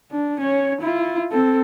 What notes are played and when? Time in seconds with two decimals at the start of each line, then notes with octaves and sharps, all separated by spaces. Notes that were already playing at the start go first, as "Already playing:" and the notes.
0.11 D4
0.41 C#4 C#5
0.81 E4 F4
1.32 C4 A4